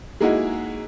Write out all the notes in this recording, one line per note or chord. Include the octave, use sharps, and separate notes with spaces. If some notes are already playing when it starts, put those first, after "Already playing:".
G#3 A#3 D#4 E4 F#4 G#4